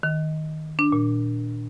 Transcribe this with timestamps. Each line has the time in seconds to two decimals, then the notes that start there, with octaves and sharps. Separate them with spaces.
0.03 D#3
0.79 D4
0.92 A#2